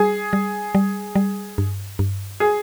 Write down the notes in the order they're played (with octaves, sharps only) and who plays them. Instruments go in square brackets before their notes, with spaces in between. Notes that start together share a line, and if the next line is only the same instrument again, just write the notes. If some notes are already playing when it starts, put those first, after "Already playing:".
Already playing: [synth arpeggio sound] G3 [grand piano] G#4
[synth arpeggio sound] G3
G3
G3
G2
G2
[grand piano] G#4